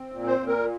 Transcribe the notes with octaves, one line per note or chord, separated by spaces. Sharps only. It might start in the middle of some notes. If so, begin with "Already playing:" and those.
Already playing: C4
A#2
C5
A#2
A#4